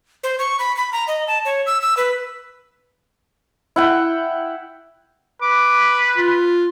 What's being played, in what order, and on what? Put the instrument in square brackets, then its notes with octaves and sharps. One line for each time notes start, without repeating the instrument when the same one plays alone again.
[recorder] C5
C#6
B5
B5
A#5
D#5
A5
C#5
E6
E6
B4
[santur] E4 F#5 G5
[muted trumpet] B4 [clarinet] D6
[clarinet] F4